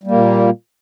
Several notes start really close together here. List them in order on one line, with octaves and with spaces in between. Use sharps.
G3 A#3 A#2